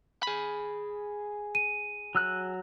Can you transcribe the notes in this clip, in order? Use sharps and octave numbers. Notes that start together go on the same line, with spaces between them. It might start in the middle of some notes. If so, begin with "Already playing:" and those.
G#4 B5
D#7
F#3 E6 F#6